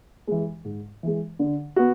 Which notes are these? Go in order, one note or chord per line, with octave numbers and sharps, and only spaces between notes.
E3 G#3
G#2
E3 G#3
D3
B3 F#4